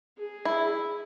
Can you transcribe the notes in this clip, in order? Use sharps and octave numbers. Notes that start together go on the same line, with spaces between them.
G#4
E4